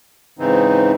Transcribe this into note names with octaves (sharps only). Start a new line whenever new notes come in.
G#2 C#3 E3 C4 D#4